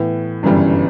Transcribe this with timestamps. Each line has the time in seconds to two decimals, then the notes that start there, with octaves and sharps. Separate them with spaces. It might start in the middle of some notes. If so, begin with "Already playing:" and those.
Already playing: A2 E3 B3
0.43 G1 F#2 C#3 E3 G3